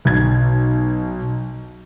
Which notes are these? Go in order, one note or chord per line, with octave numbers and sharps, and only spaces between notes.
B1 G#6